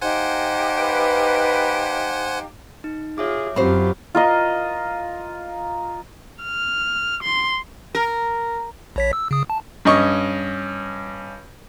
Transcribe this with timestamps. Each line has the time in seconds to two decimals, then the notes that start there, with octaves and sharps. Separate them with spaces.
0.01 D#4 G4 C5 F5 F#5 G#5
0.79 B4
2.84 D#4
3.18 F4 G#4 C#5 E5 D6
3.56 F#2 F#3 C4 F4 G4 C5 B5 C#6
4.15 F4 A#4 D#5
6.43 F6
7.23 C6
7.95 A#4
8.96 A#1 C#5 B6
9.13 E6
9.31 C#3 D#6
9.50 A5
9.85 G2 C#4 D#5 C#6